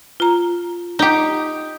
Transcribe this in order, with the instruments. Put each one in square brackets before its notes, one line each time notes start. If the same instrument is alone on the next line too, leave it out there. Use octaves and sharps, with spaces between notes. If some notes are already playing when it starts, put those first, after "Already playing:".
[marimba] F4 A#5
[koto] D#4 G4